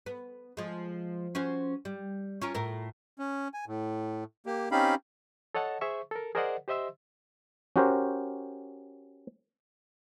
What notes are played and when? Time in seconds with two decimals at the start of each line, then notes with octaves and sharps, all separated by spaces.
0.06 B3
0.57 F3 G#3
1.35 C#4 F#4 C5
1.85 G3
2.42 C#4 F4 A#4
2.55 A2 A#4
3.19 C#4
3.54 G#5
3.67 A2
4.46 A#3 G4
4.71 C4 C#4 D#4 G4 F5 B5
5.55 A4 C#5 D#5 F#5 A5
5.81 G#4 C5 E5 C#6
6.11 A4 A#4
6.35 G#4 A#4 C5 D5 D#5 F#5
6.68 G4 C5 D#5 E5 C6 E6
7.76 C#4 F#4 G4 A#4 C5